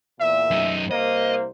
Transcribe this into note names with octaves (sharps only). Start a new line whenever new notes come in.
E2 A#2 E5
F#2 D#4
C2 A#3 E4 C5 D#5